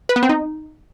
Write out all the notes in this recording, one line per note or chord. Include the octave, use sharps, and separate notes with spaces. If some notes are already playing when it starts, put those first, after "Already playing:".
B4
B3
C4
D#4